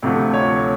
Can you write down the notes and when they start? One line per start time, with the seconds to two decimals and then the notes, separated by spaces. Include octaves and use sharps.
0.03 D2 C3 F3 A3
0.34 C#5